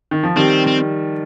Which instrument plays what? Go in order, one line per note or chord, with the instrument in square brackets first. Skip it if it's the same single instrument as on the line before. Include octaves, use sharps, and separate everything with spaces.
[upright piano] D#3
F3
[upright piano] D#3 G3 [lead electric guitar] C4
[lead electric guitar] C4